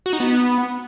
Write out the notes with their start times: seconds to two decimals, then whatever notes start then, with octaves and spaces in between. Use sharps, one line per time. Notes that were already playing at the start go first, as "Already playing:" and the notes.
0.06 F#4
0.13 D#4
0.20 B3